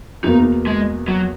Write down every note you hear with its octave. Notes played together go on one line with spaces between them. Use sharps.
E2 B2 A#3 D#4
G#3
F#3